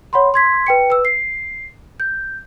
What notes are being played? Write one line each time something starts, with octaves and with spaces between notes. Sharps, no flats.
C#5 F#5 B5 C6
C6 G#6 B6
B4 G5 C#7
B4 E6
C7
G6